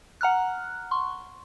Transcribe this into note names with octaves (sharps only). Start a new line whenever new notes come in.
F#5 A#5 F6 F#6
C6 C#6